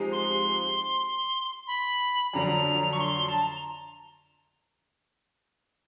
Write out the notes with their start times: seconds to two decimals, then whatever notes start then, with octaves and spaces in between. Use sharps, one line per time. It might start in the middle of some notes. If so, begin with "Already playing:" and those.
Already playing: F3 G#3 C4 D#4 G4
0.12 C6
1.67 B5
2.33 F2 D3 F#3 A#5
2.93 C#6
3.00 C6
3.28 A5
3.42 A#5